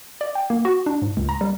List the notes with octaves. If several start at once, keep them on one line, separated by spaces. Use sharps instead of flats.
D5
G5
A#3
F#4
D4
G#2
C#2
A#5
G3